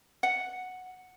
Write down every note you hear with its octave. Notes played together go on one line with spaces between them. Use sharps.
F#5